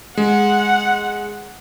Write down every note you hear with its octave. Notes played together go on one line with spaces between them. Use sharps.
G#3 F#5